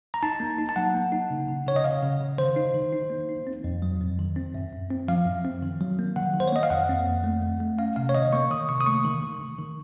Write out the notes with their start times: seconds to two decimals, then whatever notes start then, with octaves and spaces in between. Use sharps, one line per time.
0.14 A#5
0.23 D#4 A5
0.40 A#3
0.58 D#4
0.69 A5
0.76 F#3 F#5
0.94 A#3
1.12 D#4
1.30 C#3
1.48 C#3
1.67 C#3 C#5
1.76 D#5
1.84 C#3 F5
2.02 C#3
2.20 C#3
2.38 D#3 C5
2.56 D#4
2.75 D#3
2.93 D#4
3.10 A#3
3.29 D#4
3.47 C4
3.64 F2
3.82 F#3
4.01 F2
4.19 D#3
4.36 C4
4.54 F#2
4.72 F#2
4.91 C4
5.08 F3 F5
5.26 F#2
5.45 C4
5.63 D#3
5.81 F#3
5.99 A#3
6.16 D#3 F#5
6.34 D#3
6.40 C5
6.48 C#5
6.53 A#3 D#5
6.63 F5
6.70 F2 F#5
6.89 C4
7.07 F2
7.24 A3
7.42 A3
7.60 A3
7.78 C#4 F5
7.96 C3 F5
8.09 C#5
8.15 D#3 D#5
8.33 A#3 C#6
8.51 D#3 D#6
8.69 C3 C#6
8.81 D#6
8.86 A3 C#6
9.05 D#3
9.23 D#3
9.41 D#3
9.59 D#3